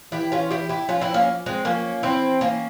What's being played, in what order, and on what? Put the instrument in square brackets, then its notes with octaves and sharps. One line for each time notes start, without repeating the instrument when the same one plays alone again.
[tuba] E3 [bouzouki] E4 G4
[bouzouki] C#4 F4
E4 G4
E4 G4
[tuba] F3 [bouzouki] C#4 F4
[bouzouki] C4 E4
A#3 C#4
G#3 C4
[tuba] F3 [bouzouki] A#3 C#4
[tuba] E3 [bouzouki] C4 E4
[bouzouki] A#3 C#4